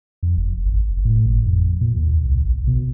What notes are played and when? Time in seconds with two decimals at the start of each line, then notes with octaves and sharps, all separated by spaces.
0.23 F2
0.37 F1
0.66 G#1
0.88 F1
1.05 A2
1.26 G#1
1.46 F2
1.81 A#2
1.96 D#2
2.25 C2
2.44 A1
2.67 B2